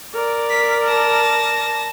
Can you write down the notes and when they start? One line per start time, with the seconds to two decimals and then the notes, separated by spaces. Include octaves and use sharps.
0.14 A#4 D5
0.50 B6
0.87 A5 A#6